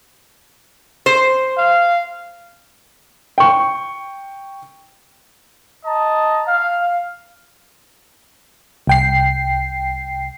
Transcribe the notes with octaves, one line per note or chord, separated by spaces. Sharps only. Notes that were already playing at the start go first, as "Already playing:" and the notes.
C5
F5
G5 C#6
D#5 A5 A#5
F5
C2 G5 C7